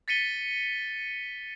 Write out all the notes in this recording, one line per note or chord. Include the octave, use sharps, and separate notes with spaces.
A6 B6 C#7 D#7 G7